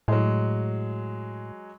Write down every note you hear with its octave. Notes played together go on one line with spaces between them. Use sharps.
A2 F#3 G#3